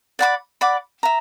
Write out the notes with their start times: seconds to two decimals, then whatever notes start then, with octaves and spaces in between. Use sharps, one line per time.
0.19 D5 F#5 B5 D6
0.61 D5 F#5 B5 D6
1.03 E5 A#5